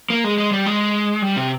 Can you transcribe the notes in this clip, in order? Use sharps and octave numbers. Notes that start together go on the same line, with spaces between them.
A#3
G#3
G#3
G3
G#3
G3
C3